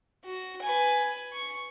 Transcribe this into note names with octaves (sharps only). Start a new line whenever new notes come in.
F#4
B4 G#5
C#6